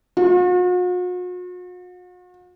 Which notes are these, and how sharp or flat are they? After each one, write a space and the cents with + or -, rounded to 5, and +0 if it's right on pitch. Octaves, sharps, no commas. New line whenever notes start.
F#4 -45